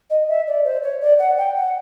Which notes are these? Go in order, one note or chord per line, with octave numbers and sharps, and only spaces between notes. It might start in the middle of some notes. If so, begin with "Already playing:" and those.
D#5
E5
D5
C5
C#5
D5
F#5
G5
F#5